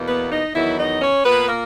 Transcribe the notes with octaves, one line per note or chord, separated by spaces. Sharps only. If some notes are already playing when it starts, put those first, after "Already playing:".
Already playing: E2 B2 A#3
B3 B4
D#4 D#5
E2 D#3 F#3 E4 E5
D#4 D#5
C#4 C#5
A#2 A#3 B3 B4
A#3 A#4